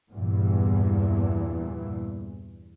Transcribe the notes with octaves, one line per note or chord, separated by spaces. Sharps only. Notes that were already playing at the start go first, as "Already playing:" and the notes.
E2 G2 A#2 E3